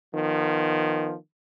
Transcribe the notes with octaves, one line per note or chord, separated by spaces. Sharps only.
D#3 F3 B3